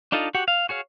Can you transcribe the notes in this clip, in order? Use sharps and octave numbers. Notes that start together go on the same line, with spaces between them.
D4 D#4 F4 A4 D#5
F#4 G4 F#5
F5
F#4 G#4 C#5 F5